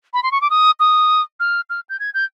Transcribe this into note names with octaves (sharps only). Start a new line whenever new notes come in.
B5
C6
C#6
D6
D#6
D#6
F6
F6
G6
G#6
G6